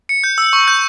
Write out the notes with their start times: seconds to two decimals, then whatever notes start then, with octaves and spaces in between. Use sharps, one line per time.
0.09 C#7
0.24 G6
0.38 E6
0.53 C#6
0.68 G6